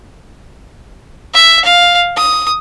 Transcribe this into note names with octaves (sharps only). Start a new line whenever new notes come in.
E5
F5
D#6